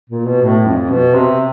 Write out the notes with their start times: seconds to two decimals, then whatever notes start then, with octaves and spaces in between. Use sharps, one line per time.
0.10 A#2
0.25 B2
0.42 A2
0.66 F2
0.90 B2
1.14 C3